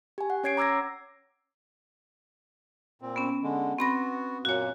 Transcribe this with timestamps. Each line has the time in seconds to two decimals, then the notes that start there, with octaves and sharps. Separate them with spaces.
0.18 G4 G#5
0.30 F#5
0.44 C#4 C#5 G#6 C7 D7
0.57 A#5 D6 E6 G#6 A#6
3.02 A#2 C4
3.16 B3 C#4
3.43 D3 G#3
3.79 B3 C4 F#4 B5 A#6
4.45 F#2 A#2 A#3 F#4 C#5